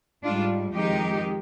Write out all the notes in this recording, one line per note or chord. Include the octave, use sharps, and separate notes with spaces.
G#2 G3 D4 F4
F2 D#3 G#3 D#4 G4